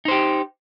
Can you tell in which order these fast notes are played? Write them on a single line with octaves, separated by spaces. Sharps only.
D#4 C5 G4